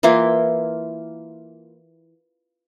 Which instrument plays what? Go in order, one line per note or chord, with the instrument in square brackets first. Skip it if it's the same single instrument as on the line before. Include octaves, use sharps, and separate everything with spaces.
[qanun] E3 A#3 E4 F4